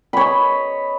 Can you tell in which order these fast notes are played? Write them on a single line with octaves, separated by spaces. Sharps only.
B5 C#5 D#5